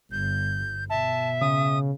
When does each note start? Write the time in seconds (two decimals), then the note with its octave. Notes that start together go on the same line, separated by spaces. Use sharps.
0.11 G1 G6
0.90 B2 E5 A5
1.41 C#3 D#6